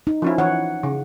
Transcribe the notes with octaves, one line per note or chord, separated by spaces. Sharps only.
D#4
F3 C#4 E4
E3 C#5 F#5
C#3